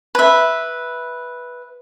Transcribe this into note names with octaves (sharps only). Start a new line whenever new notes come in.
B4 E5